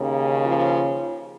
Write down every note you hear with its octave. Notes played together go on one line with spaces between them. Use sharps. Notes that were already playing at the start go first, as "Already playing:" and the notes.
Already playing: D#2 C#3
F3